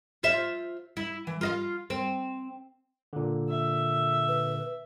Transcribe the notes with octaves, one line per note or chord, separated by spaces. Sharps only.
F4 C5 E5
E4
E3
F4 D#5 F5
C4
A#2 D3
E5
B4